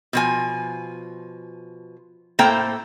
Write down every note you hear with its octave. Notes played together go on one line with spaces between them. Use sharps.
B2 F3 G#5
A2 A3 A#3 C5 G5 A#5